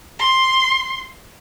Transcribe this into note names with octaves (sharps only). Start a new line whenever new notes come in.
C6